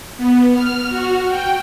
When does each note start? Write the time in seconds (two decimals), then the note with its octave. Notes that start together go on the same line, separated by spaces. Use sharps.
0.18 B3
0.53 F6
0.89 F#4
1.29 G5